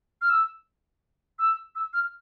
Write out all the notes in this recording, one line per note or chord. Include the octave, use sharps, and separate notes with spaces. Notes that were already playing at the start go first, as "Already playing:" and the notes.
F6
E6
E6
E6
F6